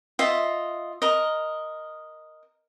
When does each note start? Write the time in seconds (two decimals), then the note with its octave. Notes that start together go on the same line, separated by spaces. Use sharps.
0.19 F4 D#5 E5
1.02 A#4 D#5